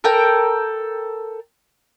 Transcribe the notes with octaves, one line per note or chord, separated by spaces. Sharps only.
A4 A#4 G5